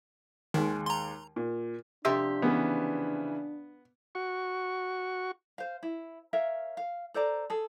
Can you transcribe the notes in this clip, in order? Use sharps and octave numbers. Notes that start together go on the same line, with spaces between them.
D#2 D#3 G#3
A#5 C6
A#2
F2 C3 D4 G4 E5 C6
C#3 E3 B3
F#4 C#6
C5 F5
E4
A#4 C#5 E5 F5
F5
A4 C5 D5 A#5
G#4 A4